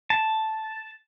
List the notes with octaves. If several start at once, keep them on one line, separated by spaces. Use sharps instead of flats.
A5